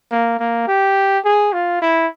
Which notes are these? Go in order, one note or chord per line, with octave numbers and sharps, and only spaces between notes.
A#3
A#3
G4
G#4
F4
E4